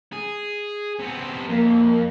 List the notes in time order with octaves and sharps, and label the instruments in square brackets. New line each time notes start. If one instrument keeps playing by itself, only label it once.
[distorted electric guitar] G#4
C3 B3
[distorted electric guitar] F2 [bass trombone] A#3